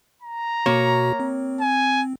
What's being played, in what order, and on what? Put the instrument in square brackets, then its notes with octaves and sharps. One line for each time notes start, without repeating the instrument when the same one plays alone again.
[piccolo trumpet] A#5
[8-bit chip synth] B2 F#4 [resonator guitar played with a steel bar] A#3 C#5
[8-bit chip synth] C4
[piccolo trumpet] G#5